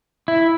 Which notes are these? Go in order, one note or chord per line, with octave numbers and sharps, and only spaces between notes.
E4